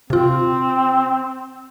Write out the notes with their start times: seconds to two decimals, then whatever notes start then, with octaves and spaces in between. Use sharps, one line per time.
0.10 C3 C4 F4